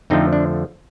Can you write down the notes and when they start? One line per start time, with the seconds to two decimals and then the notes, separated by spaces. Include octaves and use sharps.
0.10 F2 D3 F3 A3 C4 D#4
0.33 D4